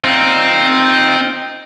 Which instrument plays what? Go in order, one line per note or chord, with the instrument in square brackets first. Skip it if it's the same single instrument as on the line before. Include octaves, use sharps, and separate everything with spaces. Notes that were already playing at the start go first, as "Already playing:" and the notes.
[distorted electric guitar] C4 [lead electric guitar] D#4 F4